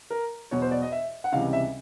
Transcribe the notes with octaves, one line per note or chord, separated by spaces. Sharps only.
A#4
E2 B2 F#3 C#5
C5
D5
D#5
E5
F#5
C#2 C3 E3 G3 F5
E5